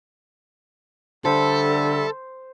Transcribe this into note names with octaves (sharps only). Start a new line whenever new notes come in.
D3 G3 A4 C5 E5